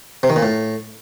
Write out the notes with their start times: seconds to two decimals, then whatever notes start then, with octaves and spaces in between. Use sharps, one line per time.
0.23 C3
0.30 D#3
0.36 A#2
0.43 A2